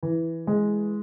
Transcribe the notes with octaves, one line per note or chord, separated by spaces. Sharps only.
E3
G#3